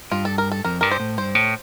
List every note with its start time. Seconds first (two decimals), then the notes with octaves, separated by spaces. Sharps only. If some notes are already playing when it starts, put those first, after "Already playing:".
0.11 G2 F4
0.25 A4
0.38 A#4
0.52 A4
0.64 F2 A#4
0.81 G2 A#4
0.91 C5
1.00 A2
1.18 G2 C5
1.35 A2